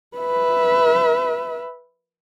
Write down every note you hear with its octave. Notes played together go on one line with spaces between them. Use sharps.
B4 E5